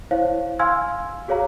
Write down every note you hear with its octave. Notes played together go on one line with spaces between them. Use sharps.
E4 C5 C#5 F5
F5 G#5 C6 E6 F6 G#6
F#4 G#4 C#5 F5 A#5